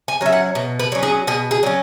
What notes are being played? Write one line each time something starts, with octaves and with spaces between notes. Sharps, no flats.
G#5
F#3 C#4 E5
F#5
B2
B4
F#3 C#4
G#4
B2 G#4
G#4
F#3 C#4